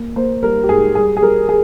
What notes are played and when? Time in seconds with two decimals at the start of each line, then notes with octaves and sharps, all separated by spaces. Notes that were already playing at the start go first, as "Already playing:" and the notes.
Already playing: A#3
0.16 A#3 C5
0.43 G3 A#4
0.63 G4
0.69 G#2 G#4
0.95 G3 G#4
1.17 G#4
1.22 G3 A#4
1.49 G#4